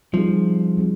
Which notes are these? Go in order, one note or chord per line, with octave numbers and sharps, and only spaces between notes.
F3 G3 C4 D#4 G#4
G3 C4 D#4 G#4